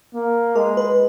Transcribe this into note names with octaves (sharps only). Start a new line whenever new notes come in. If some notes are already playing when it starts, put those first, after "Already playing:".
A#3
G#3 A#4
B4